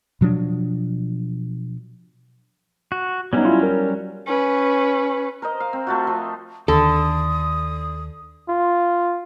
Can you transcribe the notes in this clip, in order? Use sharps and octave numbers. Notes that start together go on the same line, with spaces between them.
B2 F3 F#3 D4
F#4
F#3 G3 B3 C#4 D#4
E4 F4
A#4
C#4 B4
A#4 C5 D#5
F5
C4
A3 F4 F#4
F3
D#2 D3 A4 D#6
F4